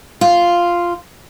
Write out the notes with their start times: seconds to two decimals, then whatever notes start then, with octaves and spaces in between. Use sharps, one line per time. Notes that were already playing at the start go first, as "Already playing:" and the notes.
0.21 F4